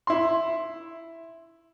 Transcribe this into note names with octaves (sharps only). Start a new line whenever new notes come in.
E4 C6